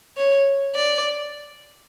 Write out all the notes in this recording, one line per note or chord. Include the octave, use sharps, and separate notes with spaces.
C#5
D5